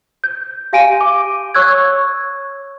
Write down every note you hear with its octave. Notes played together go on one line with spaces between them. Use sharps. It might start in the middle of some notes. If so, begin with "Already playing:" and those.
G6
G4 F5 G#5 D7 D#7
D6
C#5 C#6 E6 F#6 G#6